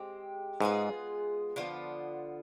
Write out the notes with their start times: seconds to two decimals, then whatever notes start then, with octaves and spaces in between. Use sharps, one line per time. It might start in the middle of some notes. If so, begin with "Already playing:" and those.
Already playing: G#3 C4 G4
0.61 G#2 G#3 B3 F4 G#4
1.56 D3 F3 B3 F4